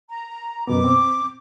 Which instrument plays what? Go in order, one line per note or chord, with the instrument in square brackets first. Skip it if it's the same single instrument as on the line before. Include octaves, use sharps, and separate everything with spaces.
[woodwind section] A#5
[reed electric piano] F#2 B2 B3 [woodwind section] D6
[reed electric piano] C4